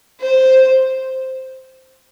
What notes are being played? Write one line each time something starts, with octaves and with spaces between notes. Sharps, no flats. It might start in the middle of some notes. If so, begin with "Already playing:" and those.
C5